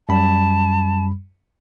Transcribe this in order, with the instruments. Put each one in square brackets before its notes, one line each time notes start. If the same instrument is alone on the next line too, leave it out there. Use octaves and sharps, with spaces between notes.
[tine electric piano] F#2 G3 B5 [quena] A5